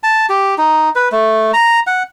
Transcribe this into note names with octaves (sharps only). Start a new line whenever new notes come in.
A5
G4
D#4
B4
A3
A#5
F#5